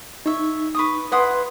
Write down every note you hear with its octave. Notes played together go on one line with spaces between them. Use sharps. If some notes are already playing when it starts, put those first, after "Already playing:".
D#4 C#5 E5
B4 C#6 D#6
E4 B4 F#5 C6 D#6